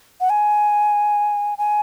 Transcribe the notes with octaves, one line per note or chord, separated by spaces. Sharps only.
F#5
G#5
G#5